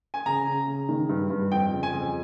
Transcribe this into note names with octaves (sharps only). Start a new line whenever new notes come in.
G#5
C#3 A#5
C#3
C#3
D#3
G2
G2
F2 G5
C#3
G#5
F2